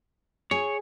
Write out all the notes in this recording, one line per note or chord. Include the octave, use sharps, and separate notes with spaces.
G#4 C#5